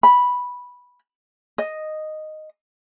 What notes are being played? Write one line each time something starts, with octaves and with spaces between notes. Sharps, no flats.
B5
D#5